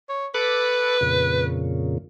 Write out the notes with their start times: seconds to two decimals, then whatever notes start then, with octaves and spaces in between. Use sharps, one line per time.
0.09 C#5
0.34 A4 B4 B5 D6
1.01 F2 A#2 C#3